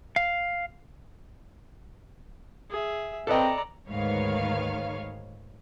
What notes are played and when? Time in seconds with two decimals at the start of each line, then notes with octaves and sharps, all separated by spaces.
0.16 F5
2.70 G#4 E5
3.27 C4 A4 B4 D5 D#5 A#5
3.87 D2 G#2 D#3 B4 C#5 F5